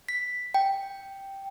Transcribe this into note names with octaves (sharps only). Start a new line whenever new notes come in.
B6
G5